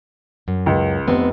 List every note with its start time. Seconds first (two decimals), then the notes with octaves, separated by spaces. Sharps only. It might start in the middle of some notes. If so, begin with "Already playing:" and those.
0.48 F#2
0.66 C#2
1.08 F1 B3 C4